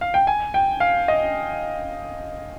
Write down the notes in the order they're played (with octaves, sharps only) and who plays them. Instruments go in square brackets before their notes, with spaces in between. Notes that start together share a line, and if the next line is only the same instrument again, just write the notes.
[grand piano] F5
G5
G#5
G5
F5
D#5